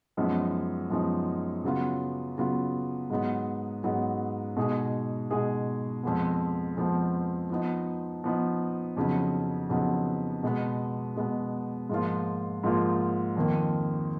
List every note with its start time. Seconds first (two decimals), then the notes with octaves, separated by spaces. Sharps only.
0.17 F#2 F3 G#3 B3 D#4
0.90 F#2 F3 G#3 B3 D#4
1.63 C#3 F#3 B3 F4
2.37 C#3 F#3 B3 F4
3.10 G#2 F#3 B3 D#4
3.84 G#2 F#3 B3 D#4
4.56 B2 G#3 D#4 G#4
5.30 B2 G#3 D#4 G#4
6.03 F2 F3 G#3 B3
6.77 F2 F3 G#3 B3
7.50 F3 B3 D#4
8.24 F3 B3 D#4
8.97 F2 C#3 F#3 B3 D#4
9.70 F2 C#3 F#3 B3 D#4
10.43 B2 G#3 B3
11.16 B2 G#3 B3
11.89 G#2 F3 A#3 F4
12.63 G#2 F3 A#3 F4
13.36 F2 D#3 A#3